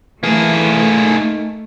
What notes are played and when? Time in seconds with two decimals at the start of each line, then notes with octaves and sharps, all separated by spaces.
0.23 E3 A3 A#3 G#4
1.02 D#4